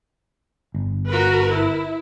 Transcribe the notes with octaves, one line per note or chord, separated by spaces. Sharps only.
G1
F#4 A#4 B4
E4